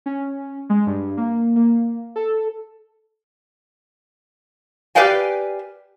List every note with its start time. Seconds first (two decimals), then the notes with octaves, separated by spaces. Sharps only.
0.06 C#4
0.70 G#3
0.86 G2
1.17 A#3
1.56 A#3
2.16 A4
4.95 G4 B4 D5 F5 G5 G#5